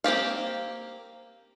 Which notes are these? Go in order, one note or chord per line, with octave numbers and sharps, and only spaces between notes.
A#3 C4 G4 F5